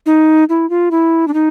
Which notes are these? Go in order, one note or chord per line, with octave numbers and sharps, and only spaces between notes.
D#4
E4
F4
E4
D4
D#4